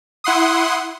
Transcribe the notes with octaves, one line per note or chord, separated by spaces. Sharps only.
E4 F#5 C6 D#6